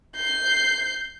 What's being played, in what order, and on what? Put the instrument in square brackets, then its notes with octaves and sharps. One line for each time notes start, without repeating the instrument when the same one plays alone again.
[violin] G6 C7